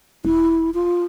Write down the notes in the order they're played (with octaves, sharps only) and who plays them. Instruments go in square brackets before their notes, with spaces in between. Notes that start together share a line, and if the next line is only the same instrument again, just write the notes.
[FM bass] E1 [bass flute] E4
[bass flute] F4